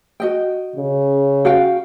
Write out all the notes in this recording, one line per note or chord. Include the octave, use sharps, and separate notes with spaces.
F#4 D#5 G5
C#3
F#4 F5 G5